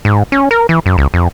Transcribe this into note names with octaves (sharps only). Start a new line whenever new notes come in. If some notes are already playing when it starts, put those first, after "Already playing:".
G#2
C#4
A#4
E3
F#2
C#2
F2